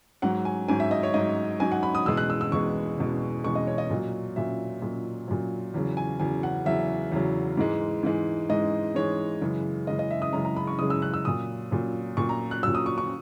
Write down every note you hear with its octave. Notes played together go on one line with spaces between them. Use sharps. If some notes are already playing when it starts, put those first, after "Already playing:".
G#2 F#3 F#5
G#5
G#2 F#3 G#5
E5
D#5
C#5
G#2 F#3 D#5
G#2 F#3 G#5
F#5
B5
D#6
E2 B2 G#3 E6
F#6
E6
E6
E2 B2 G#3 C#6
E2 B2 G#3
E2 B2 G#3 C#6
D#5
C#5
D#5
A#2 F#3
A#2 F#3 E5
A#2 F#3
A#2 F#3
E2 C#3 F#3
G#5
E2 C#3 F#3 G#5
F#5
E2 C#3 F#3 E5
E2 C#3 F#3
G#2 E3 G#3
G#2 E3 G#3
G#2 E3 G#3 D#5
G#2 E3 G#3 C#5
F#2 C#3 E3 G#3
F#2 C#3 E3 G#3 D#5
D#5
E5
D#6
F#2 C#3 E3 G#3 A#5
A#5
B5
C#6
F#2 C#3 E3 G#3 D#6
E6
F#6
E6
A#2 F#3 D#6
A#2 F#3
A#2 F#3 C#6
A#5
F#6
A#2 F#3 E6
D#6
C#6
C#6